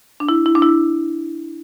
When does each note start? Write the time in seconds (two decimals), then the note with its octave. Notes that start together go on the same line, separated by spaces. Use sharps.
0.20 D4
0.29 E4
0.46 E4
0.55 D4
0.62 E4